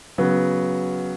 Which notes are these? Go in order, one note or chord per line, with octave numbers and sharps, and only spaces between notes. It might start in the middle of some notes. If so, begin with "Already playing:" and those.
C#3 F#3 B3